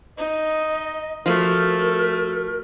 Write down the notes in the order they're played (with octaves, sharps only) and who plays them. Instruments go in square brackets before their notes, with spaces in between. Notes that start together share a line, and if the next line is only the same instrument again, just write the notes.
[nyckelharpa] D#4 [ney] D#5
[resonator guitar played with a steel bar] F3 [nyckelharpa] A3 [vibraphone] F#4 [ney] A#4